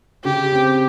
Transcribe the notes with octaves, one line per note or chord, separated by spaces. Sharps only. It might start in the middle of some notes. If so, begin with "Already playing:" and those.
C#3 G4
C4